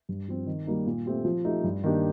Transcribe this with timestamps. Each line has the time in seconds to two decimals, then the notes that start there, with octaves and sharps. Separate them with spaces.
0.09 G2
0.28 F3 C4
0.47 D#3
0.67 G3 A#3 D#4
0.87 A#2
1.06 A3 C4 G4
1.25 F3
1.45 A3 D#4 G4
1.64 G2
1.84 D#3 A#3 D4 G4